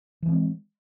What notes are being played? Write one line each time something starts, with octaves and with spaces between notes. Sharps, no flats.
E3 F3 G#3 C4